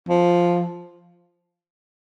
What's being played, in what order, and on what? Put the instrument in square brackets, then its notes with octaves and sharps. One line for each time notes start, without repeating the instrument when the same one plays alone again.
[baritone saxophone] F3